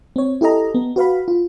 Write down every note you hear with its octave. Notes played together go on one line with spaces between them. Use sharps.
C4 C#5
E4 G4 A4 D#5 A#5
B3
F#4 B4 F5 B5
F4